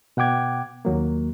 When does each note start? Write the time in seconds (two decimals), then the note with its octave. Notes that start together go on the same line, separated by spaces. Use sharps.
0.17 B2 F#5 G5 D6 G#6
0.85 D#2 F#3 A#3